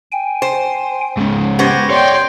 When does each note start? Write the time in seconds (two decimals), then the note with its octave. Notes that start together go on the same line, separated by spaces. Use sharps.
0.11 G5 G#5
0.42 C5
1.18 G#2 C#3
1.59 B3 C#4 G4 C5 G#6 A#6
1.90 C#5 D5 G5 C6